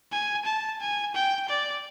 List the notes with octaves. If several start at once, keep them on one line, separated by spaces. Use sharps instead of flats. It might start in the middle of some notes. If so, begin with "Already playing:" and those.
G#5
A5
G#5
G5
D5